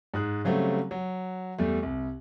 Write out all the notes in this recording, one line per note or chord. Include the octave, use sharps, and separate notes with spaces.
G#2 G#4 F#6
C#3 F#3 G3 A3 C4
F#3
E2 G3 A3
C2